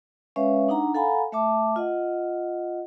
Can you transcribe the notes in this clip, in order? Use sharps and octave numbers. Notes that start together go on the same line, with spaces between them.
G#3 C#4 B4 C#5 E5 F5
D4 D#4 F#5 A#5
A4 F5 F#5 G#5 A#5 B5
A3 E5 A5 D6
F4 D#5 F#5